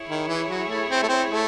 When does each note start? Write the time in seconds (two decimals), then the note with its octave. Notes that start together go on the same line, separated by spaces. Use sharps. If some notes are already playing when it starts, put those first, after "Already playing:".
Already playing: E4 G#4 C#5
0.10 D#3
0.28 E3
0.49 F#3
0.69 A3
0.89 C4
1.03 A3
1.09 C4
1.29 A3